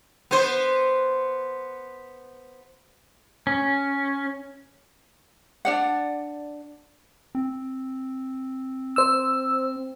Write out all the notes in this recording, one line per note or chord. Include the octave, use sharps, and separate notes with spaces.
B3 C5
C#4
D4 D5 F#5
C4
C5 E6